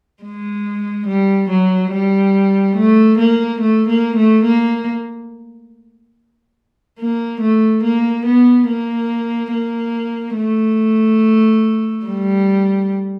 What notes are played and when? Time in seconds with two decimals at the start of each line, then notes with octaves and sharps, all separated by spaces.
0.23 G#3
1.07 G3
1.49 F#3
1.91 G3
2.76 A3
3.18 A#3
3.61 A3
3.88 A#3
4.17 A3
4.45 A#3
6.99 A#3
7.41 A3
7.83 A#3
8.26 B3
8.67 A#3
9.52 A#3
10.37 A3
12.05 G3